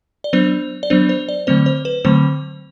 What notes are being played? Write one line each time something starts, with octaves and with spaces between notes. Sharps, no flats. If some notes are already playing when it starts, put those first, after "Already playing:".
D5
F#3 B3 D4 C5
D5
F#3 B3 D4 C5
C5
D5
D3 F#3 A3 C4 C5
C5
B4
D3 F#3 A3 C4 C5